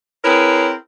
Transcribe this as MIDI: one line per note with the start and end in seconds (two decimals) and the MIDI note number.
0.24 0.73 60
0.24 0.73 64
0.24 0.73 68
0.24 0.73 70
0.24 0.73 71
0.24 0.73 73